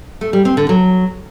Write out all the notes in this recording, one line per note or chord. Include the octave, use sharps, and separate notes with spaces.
A3
G3
C4
D3
F#3